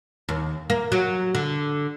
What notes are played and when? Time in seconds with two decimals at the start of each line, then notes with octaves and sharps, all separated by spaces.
0.29 D#2
0.70 A#3
0.92 F#3
1.35 D3